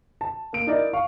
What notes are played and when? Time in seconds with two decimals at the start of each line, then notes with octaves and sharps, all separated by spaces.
0.21 A5
0.53 A#3 D7
0.67 D#4 E4 A#4 D5 D#5
0.93 F5 C#6